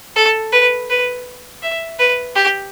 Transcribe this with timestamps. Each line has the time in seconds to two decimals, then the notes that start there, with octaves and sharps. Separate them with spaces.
0.16 A4
0.52 B4
0.90 B4
1.62 E5
1.99 B4
2.35 G4